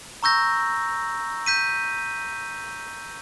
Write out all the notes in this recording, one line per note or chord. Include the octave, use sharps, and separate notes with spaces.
A#5 C#6 E6 G6 A#6
G6 B6 D#7